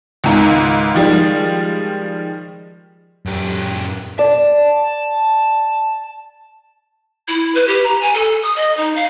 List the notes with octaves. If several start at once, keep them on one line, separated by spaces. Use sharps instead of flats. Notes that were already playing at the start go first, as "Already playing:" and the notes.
C#2 G#2 D#3
D#3 F3 G3 G#3
F#2 G4
D5 A5
E4
B4
G4
A#5
G#5
A4
D#6
D#5
D#4
F5